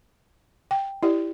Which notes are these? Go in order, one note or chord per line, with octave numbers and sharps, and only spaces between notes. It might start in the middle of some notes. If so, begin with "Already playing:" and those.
G5
E4 G4 D5